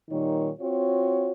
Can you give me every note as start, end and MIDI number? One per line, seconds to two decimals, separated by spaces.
0.10 0.50 46
0.10 0.50 51
0.10 0.50 55
0.10 0.50 63
0.10 0.50 73
0.61 1.32 60
0.61 1.32 65
0.61 1.32 66
0.61 1.32 73